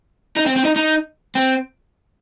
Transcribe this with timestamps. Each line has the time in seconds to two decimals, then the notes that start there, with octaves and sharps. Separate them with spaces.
0.36 D#4
0.46 C4
0.56 C4
0.65 D#4
0.76 D#4
1.35 C4